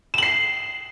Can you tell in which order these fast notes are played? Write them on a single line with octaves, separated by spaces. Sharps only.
E7 F#7 C7